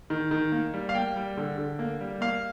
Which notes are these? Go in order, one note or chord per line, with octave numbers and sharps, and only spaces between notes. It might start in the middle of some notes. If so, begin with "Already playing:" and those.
D#3
D#3
A#3
G3
F5
A#3 G5
G3
D3
D3
A#3
G3
A#3 F5